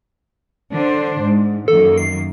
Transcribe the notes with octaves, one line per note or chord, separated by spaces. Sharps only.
D3 D4 C5
G#2
F#2 D#3 A#3 A4
C7